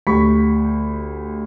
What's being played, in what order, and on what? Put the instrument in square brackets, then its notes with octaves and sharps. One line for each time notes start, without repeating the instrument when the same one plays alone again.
[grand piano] D2 G4 B5 C#6 B6